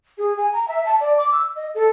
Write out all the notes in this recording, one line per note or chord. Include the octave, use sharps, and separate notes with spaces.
G#4
G#5
A#5
E5
A5
D5
D6
E6
D#5
A4